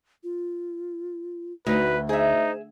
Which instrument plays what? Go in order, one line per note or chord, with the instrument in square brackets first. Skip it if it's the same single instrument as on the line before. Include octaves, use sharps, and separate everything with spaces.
[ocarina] F4
[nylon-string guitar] D2 [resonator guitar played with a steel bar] D#4 [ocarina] F#4 [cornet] B4
[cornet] D#4 [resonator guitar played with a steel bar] G#4 E5 [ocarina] C5